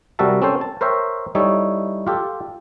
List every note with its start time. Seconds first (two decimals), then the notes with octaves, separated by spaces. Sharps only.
0.19 C3 G3 F#4 A#4 E5 A5
0.42 C4 C#4 A4 C5
0.61 A5
0.81 A#4 C5 C#5 E5 G5
1.35 G3 D#4 E4 A4 C#5
2.07 F4 G4 A4